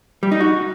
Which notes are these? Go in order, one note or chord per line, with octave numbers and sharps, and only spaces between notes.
G3
D#4
F#4